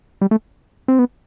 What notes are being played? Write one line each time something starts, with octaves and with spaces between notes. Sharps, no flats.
G3
A3
C4
B3